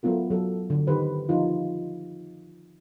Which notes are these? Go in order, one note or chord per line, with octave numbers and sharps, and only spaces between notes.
F#3 A3 B3 F4 A#4
F#3 A4
D3
D#3 G4 B4 C5
F3 D#4 F4